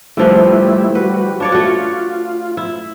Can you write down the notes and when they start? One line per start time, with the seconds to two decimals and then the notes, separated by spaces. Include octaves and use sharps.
0.17 D3 F3 G3 A3 E4 B4
0.95 G3 F#4 B4
1.40 D4 F4 C#5 D5
1.52 A3 F#4
2.57 E4